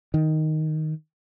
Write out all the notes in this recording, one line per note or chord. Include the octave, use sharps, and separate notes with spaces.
D#3